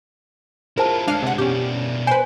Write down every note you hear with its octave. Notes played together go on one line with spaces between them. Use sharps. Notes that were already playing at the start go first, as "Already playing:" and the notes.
E4 F4 G#4 A#4 C5 A5
D3 G#3 D4 F5
C3 F#5
B2 C#4 D4 G4
B4 C5 G#5